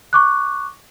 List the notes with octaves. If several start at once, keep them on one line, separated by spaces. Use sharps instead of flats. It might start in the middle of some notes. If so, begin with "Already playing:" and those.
C#6 D6 F#6